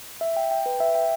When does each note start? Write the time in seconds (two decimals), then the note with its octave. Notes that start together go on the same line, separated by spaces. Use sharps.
0.21 E5
0.36 G5
0.51 G5
0.66 B4
0.80 E5
0.95 G5